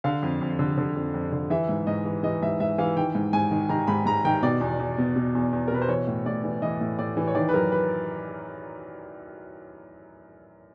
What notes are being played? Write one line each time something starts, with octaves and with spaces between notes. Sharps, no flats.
D3 F5
F2
F2
D3
D3
F2
F2
D3
E3 E5
G#2
G#2 D#5
E3
E3 D#5
G#2 E5
G#2 E5
E3 F5
D#3 G5
G#2
G#2 G#5
D#3
D#3 A#5
G#2 B5
G#2 A#5
D#3 G5
B2 D5
E2
E2
B2
B2
E2
E2
A#4
B2 B4
C5
E3 C#5
A2
A2 D5
E3
E3 D#5
A2
A2 D5
E3
C#5
D#3 D5
B4
F#2 A#4
B4